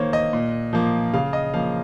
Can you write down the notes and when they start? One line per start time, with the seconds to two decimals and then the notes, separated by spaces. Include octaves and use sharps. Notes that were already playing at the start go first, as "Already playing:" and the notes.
Already playing: D#3 A#3 C5 C#5
0.13 D#5
0.33 A#2
0.73 F3 A#3
1.13 C#3 F5
1.33 D#5
1.54 F3 A#3 F5